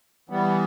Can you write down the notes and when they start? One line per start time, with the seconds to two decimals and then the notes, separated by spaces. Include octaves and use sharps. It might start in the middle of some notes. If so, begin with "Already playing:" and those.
0.30 E3 G3 B3